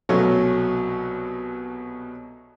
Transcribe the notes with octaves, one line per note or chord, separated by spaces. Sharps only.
C2 B2 F#3 A3 C#4 C#6